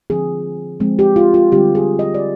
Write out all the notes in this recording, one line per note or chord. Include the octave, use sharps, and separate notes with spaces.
D3 F3 C4 G#4
F3 G#3 C4
G4
F4
F4
D3 G3 C4 G4
G#4
D#5
D5